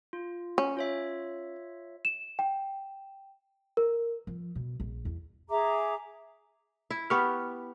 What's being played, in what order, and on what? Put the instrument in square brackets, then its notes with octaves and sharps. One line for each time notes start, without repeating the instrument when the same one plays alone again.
[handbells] F4
[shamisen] C#4
[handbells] F4 C#5 E5
[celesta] E7
G5
A#4
[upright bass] F3
B2
A#1
E2
[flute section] G#4 E5 A#5 D6
[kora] E4
[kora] B3 G4 [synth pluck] B5 C#6 F6